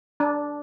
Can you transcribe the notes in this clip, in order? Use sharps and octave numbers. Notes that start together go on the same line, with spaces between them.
D4